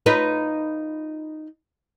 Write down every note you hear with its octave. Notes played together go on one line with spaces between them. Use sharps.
D#4 F4 B4